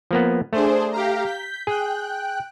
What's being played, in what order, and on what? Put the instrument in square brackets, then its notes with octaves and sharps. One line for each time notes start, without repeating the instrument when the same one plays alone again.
[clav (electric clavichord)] F3 A#3 B3
[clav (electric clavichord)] A3 [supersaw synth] D4 G#4 C5
[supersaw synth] G4 F5 A#5
G6 B6
[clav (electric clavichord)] G#4 [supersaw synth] G5 F#6